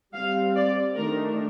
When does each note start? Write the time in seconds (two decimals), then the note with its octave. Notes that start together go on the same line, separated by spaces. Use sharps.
0.13 G3 C4 F5
0.55 D5
0.95 D#3 A3 D4 A#4